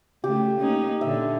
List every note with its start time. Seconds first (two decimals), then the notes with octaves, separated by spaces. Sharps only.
0.24 C#3 A3 G4
0.60 A#3 C#4 D#4
1.01 A#2 D3 E5